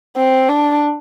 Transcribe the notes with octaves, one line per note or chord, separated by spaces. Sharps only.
C4
D4